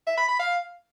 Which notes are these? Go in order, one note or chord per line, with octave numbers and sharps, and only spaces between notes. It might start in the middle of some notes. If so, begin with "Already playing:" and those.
E5
B5
B5
F5